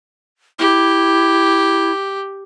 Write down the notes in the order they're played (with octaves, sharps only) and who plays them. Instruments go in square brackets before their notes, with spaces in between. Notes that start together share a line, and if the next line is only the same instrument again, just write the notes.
[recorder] E4 [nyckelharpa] G4